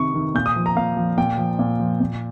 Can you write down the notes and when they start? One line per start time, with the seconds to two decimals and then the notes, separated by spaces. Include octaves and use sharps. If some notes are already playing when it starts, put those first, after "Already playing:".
Already playing: C3 D#3 C#6
0.14 D#3
0.34 A#2 G6
0.46 D#6
0.56 F3
0.66 A#5
0.76 A#2 F5
0.97 F3
1.18 A#2 G5
1.38 F3
1.59 A#2
1.80 F3
2.00 A#2